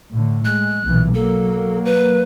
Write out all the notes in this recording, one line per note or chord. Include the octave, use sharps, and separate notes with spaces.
A2 D3
G#3 F#6
B1 A#2 E3
F#3 A#3 A4
B4